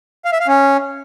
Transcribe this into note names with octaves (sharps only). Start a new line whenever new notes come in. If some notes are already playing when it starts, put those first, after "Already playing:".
F5
E5
F5
C#4